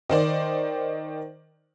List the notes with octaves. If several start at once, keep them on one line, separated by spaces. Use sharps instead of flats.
D#3 C5 D5